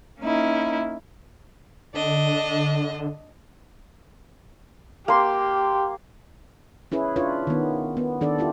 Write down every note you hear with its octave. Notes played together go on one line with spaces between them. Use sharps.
A#3 C#4 D#4 E4
D3 D4 D#5
A#3 G4 C6
C#4 E4 G#4 B4
D4 E4 F4 B4 C#5
D#3 B3
B3
D#3 D4 A4 D5
E4 F4 G4